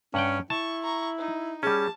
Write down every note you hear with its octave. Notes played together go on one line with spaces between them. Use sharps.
G2 C#4 F#5 G5
E4 A5 C#6
A#5 C#6
D#4
G3 C#4 G#4 A5